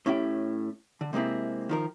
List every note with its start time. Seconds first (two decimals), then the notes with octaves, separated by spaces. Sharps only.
0.06 A2 C#4 E4 G4 G5
1.01 D3
1.13 C3 G#3 A#3 C4 E4
1.69 D#3 F3 A#4